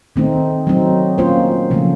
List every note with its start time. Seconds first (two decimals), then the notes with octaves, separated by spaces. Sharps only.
0.16 D#3 A3 C4 D#4
0.67 F#3 A3 C4 D#4
1.18 A#3 C#4 F4 C5
1.70 C#3 F3 A3